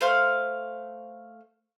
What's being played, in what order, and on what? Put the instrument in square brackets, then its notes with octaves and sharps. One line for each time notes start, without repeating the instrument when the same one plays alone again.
[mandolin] A3 C5 F5 F6